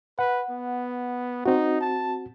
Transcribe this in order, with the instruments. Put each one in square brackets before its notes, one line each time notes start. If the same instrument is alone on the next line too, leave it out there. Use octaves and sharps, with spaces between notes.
[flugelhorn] B4 [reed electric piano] F#5
[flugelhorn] B3
[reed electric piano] C4 F#4 [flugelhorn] D#4
[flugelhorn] A5